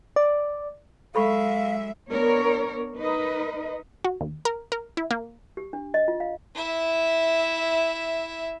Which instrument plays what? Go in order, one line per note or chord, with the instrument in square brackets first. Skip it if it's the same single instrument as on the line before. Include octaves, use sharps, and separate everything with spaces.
[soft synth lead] D5
[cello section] F#3 E5 [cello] G#3 [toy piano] A4 B5 C#6 [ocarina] F5
[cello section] B3 D4 A#4 C#5
D#4 A#4 B4 D#5
[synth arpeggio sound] F#4
D#2
A#4
A#4
E4
A#3
[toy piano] G4
D4
D#5
F4
F5
[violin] E4 E5